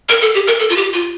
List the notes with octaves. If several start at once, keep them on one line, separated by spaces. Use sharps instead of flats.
A#4
A4
G4
A#4
A4
F4
G4
F4